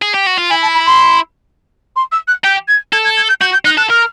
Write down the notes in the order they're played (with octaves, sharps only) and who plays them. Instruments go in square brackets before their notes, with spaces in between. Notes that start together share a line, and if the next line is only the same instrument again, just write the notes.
[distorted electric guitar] G#4
G4
F#4
F4
[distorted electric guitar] E4 [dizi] G#5
[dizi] A5
B5
C6
C6
E6
F#6
[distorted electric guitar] G4 [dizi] G6
[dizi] G#6
[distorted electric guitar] A4 [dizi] G#6
[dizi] G#6
G#6
G6
[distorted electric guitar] F#4 [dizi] G6
[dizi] G6
[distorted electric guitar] D#4 [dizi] F#6
[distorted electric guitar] A4 [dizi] F#6
[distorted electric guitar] A#4 [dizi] F6